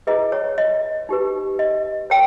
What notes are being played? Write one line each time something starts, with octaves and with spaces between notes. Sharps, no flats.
E4 G#4 B4 D#5
C#5
D#5
D#4 G4 B4
D#5
A#4 C#5 G5